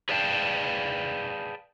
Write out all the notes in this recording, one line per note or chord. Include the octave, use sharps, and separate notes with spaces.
G#4 B4 D5 F5 G5 A5